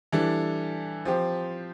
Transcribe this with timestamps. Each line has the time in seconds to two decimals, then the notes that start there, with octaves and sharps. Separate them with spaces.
0.12 E3 G3 D4 A4
1.05 F3 C4 G4